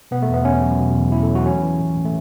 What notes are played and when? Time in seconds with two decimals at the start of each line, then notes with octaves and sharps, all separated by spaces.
0.11 B2 B3
0.22 A3
0.28 E2
0.34 B3
0.45 E2 C#4
0.61 F#3
0.79 B2
0.95 E2
1.12 E2 E4
1.23 A4
1.29 F#3
1.35 F#4
1.45 E3 C#4
1.62 E3
1.79 A2
1.96 A2
2.05 A3